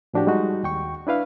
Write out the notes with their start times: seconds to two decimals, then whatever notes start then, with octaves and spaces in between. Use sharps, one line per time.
0.14 A2 F3 D4 F#4 G4
0.27 G3 G#3 D#4 F#4
0.63 D#2 G5 C#6
1.07 D4 E4 B4 F5